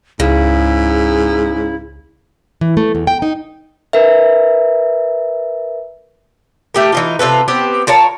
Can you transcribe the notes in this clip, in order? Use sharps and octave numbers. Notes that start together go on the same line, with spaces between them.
C#2 G#2 C#3 E4
E3
A3
E2
G5
D#4
A#4 B4 E5
A3 G4 A#4
E3 D#4 F4
C3 F4 A4 B4
B3 C4 G4
F4 A#4 C#5 A5